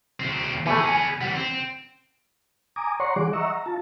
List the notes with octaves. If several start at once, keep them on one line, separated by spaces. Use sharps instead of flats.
D2 C4
E3 A3 B3 G#4
G#5
E3 G3 F#5
C4
G#5 A#5 D6 D#6
C#5 D5 F#5 A#5 C6 C#6
E3 G3 G#4 F#5 D6
D#5 E5 F#5 A#5 C#6 E6
A#5
F4 A5